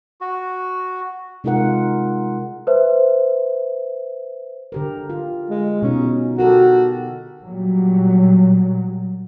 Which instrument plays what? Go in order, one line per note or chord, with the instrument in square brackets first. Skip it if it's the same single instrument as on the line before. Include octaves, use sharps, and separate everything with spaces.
[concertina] F#4
[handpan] C3 G#3 D#4 F4 A#4 F#5
[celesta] B4 C5 E5
[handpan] D3 G4 A#4
F4
[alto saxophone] G#3
[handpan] B2 D#4 [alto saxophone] C#4
[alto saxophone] F#4 [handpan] G4 A4 A#4
[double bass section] A#2 F#3 G3